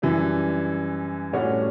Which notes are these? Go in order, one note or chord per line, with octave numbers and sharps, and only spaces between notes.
F#2 E3 G3 D4
A2 G3 C#4 F#4 C#5